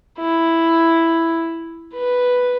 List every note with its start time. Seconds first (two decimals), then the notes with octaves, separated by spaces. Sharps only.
0.18 E4
1.93 B4